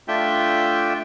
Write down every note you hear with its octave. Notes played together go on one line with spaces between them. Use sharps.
A3 D4 F4 E5 G5